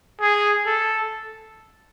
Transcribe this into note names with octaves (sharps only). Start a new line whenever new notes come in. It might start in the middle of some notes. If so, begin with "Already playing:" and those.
G#4
A4